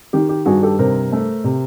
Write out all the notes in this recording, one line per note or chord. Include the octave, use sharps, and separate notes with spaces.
D#3 G4
G4
G2 F#4 G#4
G4 A4
C3 A#4 C5
A3
C3